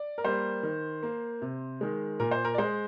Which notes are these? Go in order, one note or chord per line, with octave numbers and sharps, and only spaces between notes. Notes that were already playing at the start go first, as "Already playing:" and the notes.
Already playing: D5
A#4
G3 A#3 C5
D#3
A#3
C3
D#3 G#3
A#2 A#4
C5
A#4
D5
G#3 C5